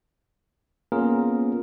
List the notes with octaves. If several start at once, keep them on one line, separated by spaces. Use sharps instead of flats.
A#3 B3 C#4 F4 G#4 A#4